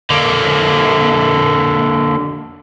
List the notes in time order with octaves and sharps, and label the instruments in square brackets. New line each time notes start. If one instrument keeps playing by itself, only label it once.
[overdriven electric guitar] D3 A#3